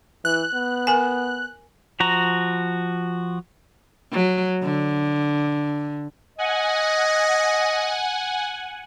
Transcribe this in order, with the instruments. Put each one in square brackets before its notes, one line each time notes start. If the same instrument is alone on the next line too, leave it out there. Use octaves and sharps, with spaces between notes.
[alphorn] E3 [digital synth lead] F#6
[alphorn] B3
[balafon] A#4 G#5
[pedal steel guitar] F3 F#4 A#5
[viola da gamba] F#3
D3
[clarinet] D#5 [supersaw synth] F#5 G#5